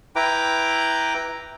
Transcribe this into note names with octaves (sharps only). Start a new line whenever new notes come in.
E4 B4 G5 A#5 D6